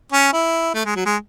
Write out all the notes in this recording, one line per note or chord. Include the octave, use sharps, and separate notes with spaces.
C#4
E4
A3
G#3
F#3
G#3